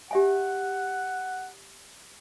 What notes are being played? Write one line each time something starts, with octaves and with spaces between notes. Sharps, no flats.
G4 E5 F#5 G#5